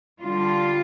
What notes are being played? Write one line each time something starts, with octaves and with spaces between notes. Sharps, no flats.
D3 G3 D4 F4